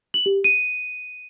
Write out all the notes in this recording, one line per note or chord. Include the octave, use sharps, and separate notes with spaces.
F#7
G4
D#7